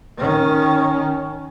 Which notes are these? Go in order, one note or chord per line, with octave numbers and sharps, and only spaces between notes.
D#3 C#4